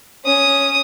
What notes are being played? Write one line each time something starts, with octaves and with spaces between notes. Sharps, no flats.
C#4 D#6